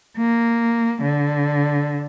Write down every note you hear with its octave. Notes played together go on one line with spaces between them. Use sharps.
A#3
D3